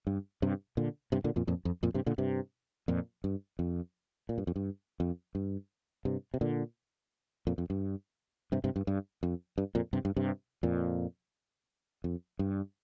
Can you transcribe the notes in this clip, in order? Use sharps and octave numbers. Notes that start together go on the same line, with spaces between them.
G2
G2 C3
A#2 D3
G2 C3
A#2 D3
F2 A#2
F2 A#2
F2
F2 A#2
G2 C3
A#2 D3
G2 C3
F2 A#2
G2
F2
A#2
G2
F2
G2
F2
G2
G2 C3
C3
A#2 D3
F2 A#2
F2
G2
G2 C3
G2 C3
G2
G2
F2
G2
F2 A#2
G2 C3
G2
G2 C3
F2 A#2
F2
G2